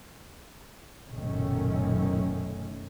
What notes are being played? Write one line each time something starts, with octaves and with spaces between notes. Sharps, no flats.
F#1 B1 A#2 D#3 A3 C#4